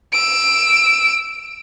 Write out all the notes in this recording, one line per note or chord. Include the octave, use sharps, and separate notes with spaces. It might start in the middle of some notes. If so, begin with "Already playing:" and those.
E6 D7